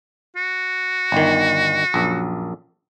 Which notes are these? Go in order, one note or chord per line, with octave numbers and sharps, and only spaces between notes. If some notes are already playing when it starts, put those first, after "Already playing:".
F#4
G1 D#3
A#1 F#2